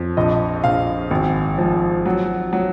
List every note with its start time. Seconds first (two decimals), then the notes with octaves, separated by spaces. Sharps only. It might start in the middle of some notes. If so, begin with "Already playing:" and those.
Already playing: F2
0.17 A#1 D#5
0.64 A#1 F5
1.11 G#1
1.58 F3
2.06 F#3
2.53 F#3